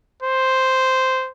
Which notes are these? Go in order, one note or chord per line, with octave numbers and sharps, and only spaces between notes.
C5